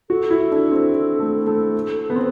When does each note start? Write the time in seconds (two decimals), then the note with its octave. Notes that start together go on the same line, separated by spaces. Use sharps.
0.10 F#4 A4
0.30 E4
0.52 D4
0.72 C4
1.19 A3
1.47 A3
2.10 B3
2.16 C4